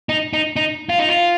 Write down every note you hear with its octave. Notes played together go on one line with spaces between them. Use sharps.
D#4
D#4
D#4
F4
D#4
F4